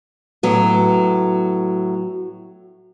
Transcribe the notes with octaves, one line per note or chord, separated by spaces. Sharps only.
A2 F#3 B3